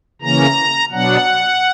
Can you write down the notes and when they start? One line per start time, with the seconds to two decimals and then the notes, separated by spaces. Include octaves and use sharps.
0.22 C#3 E3 A#3 C#4 A#5
0.92 B2 F#3 B3 D4 F#5